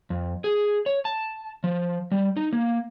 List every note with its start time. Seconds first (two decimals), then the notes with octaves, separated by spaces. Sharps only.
0.10 F2
0.44 G#4
0.86 C#5
1.05 A5
1.64 F3
2.12 G3
2.37 D#4
2.53 A#3